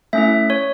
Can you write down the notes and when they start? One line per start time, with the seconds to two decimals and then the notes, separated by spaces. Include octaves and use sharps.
0.13 A3 C#4 E4 E5
0.50 C#5